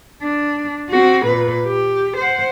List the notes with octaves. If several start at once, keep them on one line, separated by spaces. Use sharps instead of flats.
D4
C4 F#4
A#2 B4
G4
C5 F#5